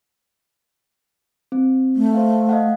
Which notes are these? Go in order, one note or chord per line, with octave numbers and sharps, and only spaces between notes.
C4
A3
C5 F5
D#5 F5 F#5